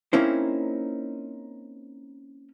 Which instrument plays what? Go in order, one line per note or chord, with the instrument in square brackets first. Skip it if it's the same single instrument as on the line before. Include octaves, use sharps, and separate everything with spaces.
[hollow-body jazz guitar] A#3 C4 C#4 D#4 E4 C5